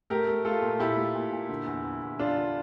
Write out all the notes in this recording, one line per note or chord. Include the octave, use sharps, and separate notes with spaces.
A3 G4 A#4
A3
A3 F4 A4
A#2
A#2 E4 G4
A3
A#2
A#2
D3
E2
E2
E2
E2 D4 F4
D3